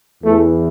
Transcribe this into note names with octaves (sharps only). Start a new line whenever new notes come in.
E2 E3 A3